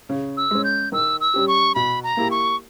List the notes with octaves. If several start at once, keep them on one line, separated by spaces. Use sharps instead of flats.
C#3
E6
G#3 C#4
G6
D#3 E6
E6
G3 C#4 G4
C#6
B2 B5
A#5
A#3 E4 G4
C#6